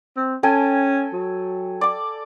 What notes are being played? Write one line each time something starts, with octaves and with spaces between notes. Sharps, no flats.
C4
C#4 A4 G5 G#5
F#3
D5 D6